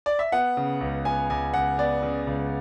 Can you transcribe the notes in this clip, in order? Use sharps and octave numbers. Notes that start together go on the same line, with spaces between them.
D5
E5
B3 F#5
C#3
C#2
B3 G#5
C#2 G#5
C#2 F#5
B3 D5
C#3
C#2